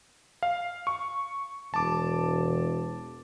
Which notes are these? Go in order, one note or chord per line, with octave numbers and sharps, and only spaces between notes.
F5
C#6
E1 A5 D6